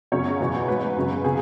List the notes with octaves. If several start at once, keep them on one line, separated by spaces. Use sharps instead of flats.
F#2 C#3 F#3 C#5
E2 B2 F#3
G#2 F#3 B4
F#2 C#3 F#3
C#3 G#4